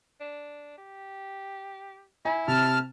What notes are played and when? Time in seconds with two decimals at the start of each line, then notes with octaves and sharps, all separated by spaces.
0.20 D4
0.78 G4
2.25 E4 G#5
2.48 C3 A5 F6